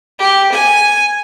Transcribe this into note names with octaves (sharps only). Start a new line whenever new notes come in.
G4
G#5